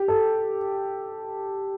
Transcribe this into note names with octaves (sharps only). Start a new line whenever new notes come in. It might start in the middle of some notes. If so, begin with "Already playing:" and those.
Already playing: G4
A4